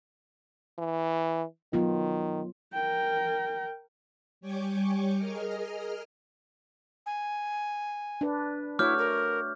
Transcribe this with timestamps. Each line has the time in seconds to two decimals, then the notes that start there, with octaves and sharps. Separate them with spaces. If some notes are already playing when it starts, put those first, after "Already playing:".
0.79 E3
1.73 D#3 F#3 B3 F4
2.74 A#4 G5
4.41 G3 C#5 G5 G#5 C#6 D6
5.18 G#4 A#4 D#5 F6
7.06 G#5
8.21 D4 B4
8.79 A3 E4 F#4 C#5 D6 F6 G6
8.98 A#4